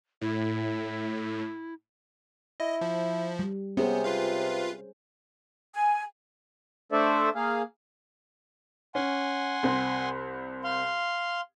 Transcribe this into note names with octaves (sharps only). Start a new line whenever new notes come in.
A2 E4
E4 D#5
F3
G3
C3 B3 C#4 G#4 C5
F4 B4 F5
G#5
A3 D4 A4 C5 D5 E5
A#3 G#4 F5
C#4 F#5 G#5 C6
C2 C4
F5 C6